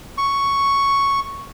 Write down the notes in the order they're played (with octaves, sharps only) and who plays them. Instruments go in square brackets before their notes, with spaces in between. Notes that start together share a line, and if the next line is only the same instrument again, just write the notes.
[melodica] C#6